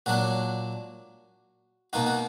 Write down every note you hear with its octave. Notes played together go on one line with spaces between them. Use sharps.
A#2 F#3 D4 F#4
B2 A#3 D#4 F#4
F#4